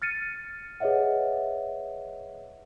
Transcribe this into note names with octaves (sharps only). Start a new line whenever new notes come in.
F6 A6 C#7 D#7
G#4 B4 C#5 D#5 E5 F#5